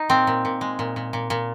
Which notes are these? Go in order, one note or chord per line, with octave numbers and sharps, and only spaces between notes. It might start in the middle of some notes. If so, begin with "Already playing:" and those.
Already playing: D#4
A#2 C4
A#2
A#2
G#3
A#2
A#2
A#2
A#2